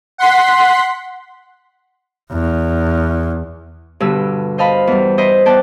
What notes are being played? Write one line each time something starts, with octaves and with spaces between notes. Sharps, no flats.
F#5 C6 B6
E2
G2 B2 D3 E6
C5 D#5 F5 A5 B5
E2 G3
E4 C5 D#5
B3 D5 G5 A5 F#6